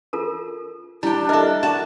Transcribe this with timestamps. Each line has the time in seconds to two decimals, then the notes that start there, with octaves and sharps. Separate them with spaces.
0.13 F4 A4 A#4
1.03 G3 D4 E4 G5
1.29 A4 A#4 D#5 E5
1.63 D4 F#4 E5 A5